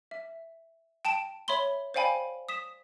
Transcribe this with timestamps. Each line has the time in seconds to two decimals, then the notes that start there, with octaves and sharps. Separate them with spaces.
0.11 E5
1.05 G5 A5 D7 E7
1.48 C#5 E5 B5 C6 G7
1.94 C5 D5 F5 G5 G#5 B5
2.49 D#6 B6 E7